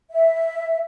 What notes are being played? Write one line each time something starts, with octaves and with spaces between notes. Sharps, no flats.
E5